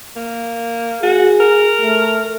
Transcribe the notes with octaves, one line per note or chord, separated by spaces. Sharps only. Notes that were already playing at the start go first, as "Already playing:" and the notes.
A#3
F#4 G#4
A#4
A3